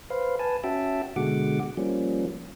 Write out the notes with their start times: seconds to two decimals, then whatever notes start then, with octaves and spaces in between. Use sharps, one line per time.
0.10 B4 C5 F5
0.39 B4 G#5 A5
0.64 C#4 F#4 E5 G5 A5
1.16 B2 D3 G#3 F#4 F#5 D6
1.77 F3 G3 A#3 C#4